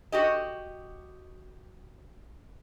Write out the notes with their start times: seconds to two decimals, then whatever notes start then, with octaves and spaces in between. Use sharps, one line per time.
0.12 F#4 G4 D#5